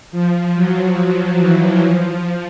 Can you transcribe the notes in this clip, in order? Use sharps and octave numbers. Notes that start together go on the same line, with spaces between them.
F3
F#3
F3
E3
F3